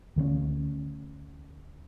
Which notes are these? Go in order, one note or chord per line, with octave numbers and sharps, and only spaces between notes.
D2 D3 A#3 C#4